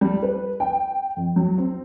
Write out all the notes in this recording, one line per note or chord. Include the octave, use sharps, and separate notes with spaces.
G3
B4
G5
F2
F#3
C4